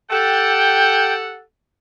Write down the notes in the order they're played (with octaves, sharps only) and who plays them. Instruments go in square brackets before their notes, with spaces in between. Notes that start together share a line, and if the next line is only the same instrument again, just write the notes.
[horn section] G4 A4 F#5 [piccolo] G5